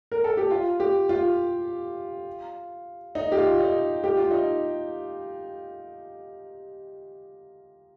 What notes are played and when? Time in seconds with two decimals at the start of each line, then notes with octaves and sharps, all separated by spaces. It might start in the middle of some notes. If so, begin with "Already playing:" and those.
0.12 A#4
0.24 A4
0.37 G4
0.51 F4
0.80 G4
1.09 F4
3.15 D#4
3.32 G4
3.37 F4
3.60 D#4
4.04 G4
4.17 F4
4.31 D#4